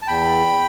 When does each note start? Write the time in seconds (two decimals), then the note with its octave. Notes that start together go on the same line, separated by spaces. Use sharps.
0.02 A5
0.07 E2 G5 B5